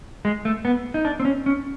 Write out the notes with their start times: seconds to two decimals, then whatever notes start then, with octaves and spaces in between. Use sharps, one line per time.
0.25 G#3
0.45 A3
0.65 B3
0.94 D#4
1.05 D4
1.20 C4
1.25 C#4
1.46 C#4